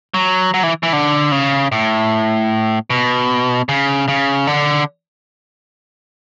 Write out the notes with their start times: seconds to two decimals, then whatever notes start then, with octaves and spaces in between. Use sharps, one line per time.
0.14 F#3
0.54 F#3
0.63 E3
0.83 E3
0.93 D3
1.32 C#3
1.72 A2
2.90 B2
3.69 C#3
4.08 C#3
4.47 D3